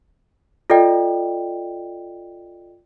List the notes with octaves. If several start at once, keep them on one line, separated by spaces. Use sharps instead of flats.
F4 A4 D5 D#5 G5